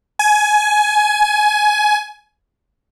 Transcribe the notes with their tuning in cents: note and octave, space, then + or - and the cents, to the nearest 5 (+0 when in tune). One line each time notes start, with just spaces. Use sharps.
G#5 +20